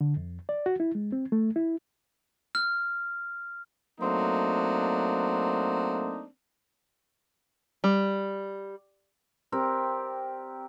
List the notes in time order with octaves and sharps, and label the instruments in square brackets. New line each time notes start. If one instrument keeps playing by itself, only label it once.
[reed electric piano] D3
F2
D5
F#4
E4
G#3
C4
A3
E4
[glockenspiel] F6
[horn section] F#3 A3 A#3 C4 D4 D#4
[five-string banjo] G3
[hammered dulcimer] C4 G4 A#4 D5